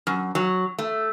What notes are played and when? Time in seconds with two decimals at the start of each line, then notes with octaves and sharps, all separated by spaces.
0.07 F#2
0.35 F#3
0.78 A3